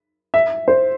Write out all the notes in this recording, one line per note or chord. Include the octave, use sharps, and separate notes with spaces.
E5
C5